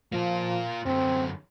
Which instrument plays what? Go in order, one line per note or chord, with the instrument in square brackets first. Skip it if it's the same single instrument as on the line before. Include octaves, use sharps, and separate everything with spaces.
[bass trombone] F3 [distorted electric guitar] A#3 F4
[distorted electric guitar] F#2 D3 [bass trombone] C4